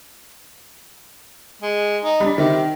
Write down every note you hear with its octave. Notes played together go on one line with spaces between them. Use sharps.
G#3
D#4
G3 D4
C3 D#3